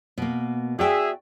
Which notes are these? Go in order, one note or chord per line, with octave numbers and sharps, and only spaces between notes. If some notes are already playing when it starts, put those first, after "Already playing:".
B2 A#3
F#4 G#4 D5 E5 G5